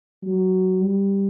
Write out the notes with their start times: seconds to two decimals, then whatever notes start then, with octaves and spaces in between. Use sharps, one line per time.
0.23 F#3
0.81 G3